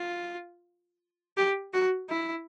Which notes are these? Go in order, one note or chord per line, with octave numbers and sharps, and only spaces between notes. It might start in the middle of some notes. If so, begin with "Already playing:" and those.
Already playing: F4
G4
F#4
E4